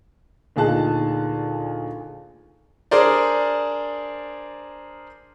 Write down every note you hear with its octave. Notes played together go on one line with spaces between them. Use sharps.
D2 A#2 D#4 G#4 A5 F#6
D4 G#4 A#4 C5 D5